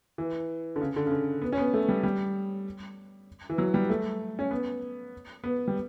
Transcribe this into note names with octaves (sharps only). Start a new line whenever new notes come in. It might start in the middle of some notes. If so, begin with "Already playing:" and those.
E3
D3
C#3
D3
C#3
D3
B3
C#4
B3
A3
G3
G3
E3
F#3
G3
A3
C#4
B3
B3
G3